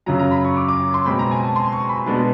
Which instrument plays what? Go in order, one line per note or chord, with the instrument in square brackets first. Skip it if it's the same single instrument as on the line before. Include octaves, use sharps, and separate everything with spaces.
[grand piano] F#2 C#3 F#3 A#5
A#5
B5
C#6
D6
D6
C6
B2 G#3 C4 B5
A#5
G#5
A5
C6
C#6
B5
B2 G#3 B3 D4 A5